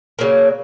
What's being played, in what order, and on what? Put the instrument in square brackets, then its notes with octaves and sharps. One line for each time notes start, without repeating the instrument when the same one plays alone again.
[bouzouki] C#3 F#3 A#3